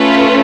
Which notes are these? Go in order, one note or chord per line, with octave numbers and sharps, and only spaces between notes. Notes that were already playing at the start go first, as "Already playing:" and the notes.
Already playing: A3 C#4 F4 B4